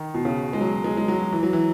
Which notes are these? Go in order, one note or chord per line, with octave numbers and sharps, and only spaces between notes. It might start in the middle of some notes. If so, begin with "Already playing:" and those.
Already playing: D#3
B2
C#3
G#3
F#3
G#3
G#3
F#3
E3
F#3
E3